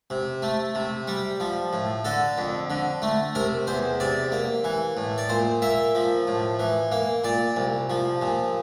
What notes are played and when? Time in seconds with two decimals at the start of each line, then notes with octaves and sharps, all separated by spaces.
0.10 C3
0.42 A3
0.75 C3
1.08 G3
1.40 F3
1.73 A2
2.05 D3 A4
2.38 F2
2.70 D3
3.02 A3
3.35 C3 A#4
3.67 E2 C5
4.00 C3 D5
4.32 A#3
4.64 E3
4.97 A2
5.18 D5
5.29 A#2 C5
5.62 A#3 E5
5.95 F3
6.27 A2
6.59 E3
6.92 A#3
7.24 A#2 D5
7.57 C2
7.90 F3
8.22 A#2